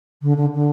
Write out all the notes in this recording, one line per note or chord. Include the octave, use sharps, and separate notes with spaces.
D3
D3
D3